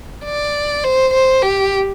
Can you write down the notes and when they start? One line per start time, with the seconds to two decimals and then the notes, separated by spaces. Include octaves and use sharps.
0.25 D5
0.84 C5
1.14 C5
1.43 G4